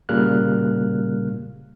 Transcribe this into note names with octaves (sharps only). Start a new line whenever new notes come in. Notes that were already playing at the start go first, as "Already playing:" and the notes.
A#2 C#3 G3 A#3 F6 F#6